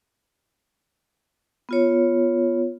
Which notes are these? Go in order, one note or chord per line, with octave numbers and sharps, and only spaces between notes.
B3 F4 C#5